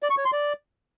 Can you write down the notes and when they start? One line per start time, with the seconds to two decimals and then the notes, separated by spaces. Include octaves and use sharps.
0.03 D5
0.10 C#6
0.18 C#5
0.25 C6
0.33 D5